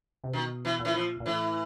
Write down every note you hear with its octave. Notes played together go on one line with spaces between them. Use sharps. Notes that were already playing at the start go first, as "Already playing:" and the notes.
C3
B2 D#3
E3
A#2
E3
F3
A#2
A2 E3